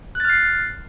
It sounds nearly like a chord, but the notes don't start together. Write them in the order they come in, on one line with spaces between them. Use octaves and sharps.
F#6 A6 F6 C7